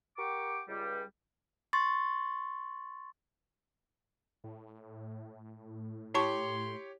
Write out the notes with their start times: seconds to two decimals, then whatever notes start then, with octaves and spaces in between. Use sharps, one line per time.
0.18 G4 A#4 F#5 G5 C#6 D6
0.68 C#2 G3
1.73 C6 C#6 A6
4.44 A2
6.15 E4 G4 C#5 A5 C6 C#6